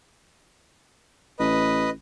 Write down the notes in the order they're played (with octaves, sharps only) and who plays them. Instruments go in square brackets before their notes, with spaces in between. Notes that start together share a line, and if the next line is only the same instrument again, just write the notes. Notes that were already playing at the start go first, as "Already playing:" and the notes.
[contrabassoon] A1 [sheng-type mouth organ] B4 D#5